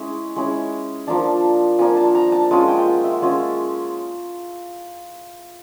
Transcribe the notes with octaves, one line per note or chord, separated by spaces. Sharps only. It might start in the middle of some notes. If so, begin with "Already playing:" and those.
Already playing: G#3 C#4 E4
G#3 C#4 E4
F3 A#3 D4 A5
F3 A#3 D4 G#5
A5
A#5
A5
G#3 C#4 F4 G#5
G5
F#5
E5
G#3 C#4 F4